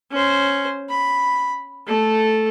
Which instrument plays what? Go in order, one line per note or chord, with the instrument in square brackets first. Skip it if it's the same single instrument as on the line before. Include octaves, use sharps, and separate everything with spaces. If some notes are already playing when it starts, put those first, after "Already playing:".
[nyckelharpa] C#4 C5
B5
A3 A4